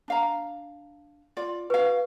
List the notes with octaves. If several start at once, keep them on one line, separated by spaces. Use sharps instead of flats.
D4 F5 A#5
F4 D5
F#4 B4 F5